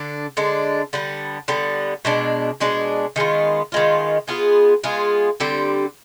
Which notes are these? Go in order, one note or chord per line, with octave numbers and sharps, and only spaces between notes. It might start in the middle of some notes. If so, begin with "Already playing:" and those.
Already playing: D3 D4
D3 G#3 D4
D3 G3 B3
D3 G3 B3
B2 G#3 D4
B2 G#3 D4
D#3 G#3 B3 F4
D#3 G#3 B3 F4
G#3 B3 F4 G#4
G#3 B3 F4 G#4
D3 G3 C4 G4